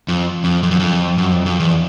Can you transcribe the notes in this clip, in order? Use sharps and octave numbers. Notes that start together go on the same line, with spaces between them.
F2
F2
F2
F#2
F2
F#2
F2
F2
E2